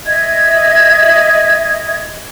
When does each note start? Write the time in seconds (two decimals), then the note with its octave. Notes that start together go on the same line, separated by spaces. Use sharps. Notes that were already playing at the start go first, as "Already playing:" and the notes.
0.05 D#5 E5 G#6